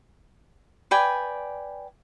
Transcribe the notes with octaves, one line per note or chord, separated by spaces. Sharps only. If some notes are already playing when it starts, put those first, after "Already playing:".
B4 D5 G5 G#5